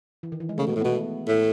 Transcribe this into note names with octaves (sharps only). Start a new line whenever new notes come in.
E3
D#3
E3
G#3
C#3 A3
B2
A3
A2
B2 B3
A2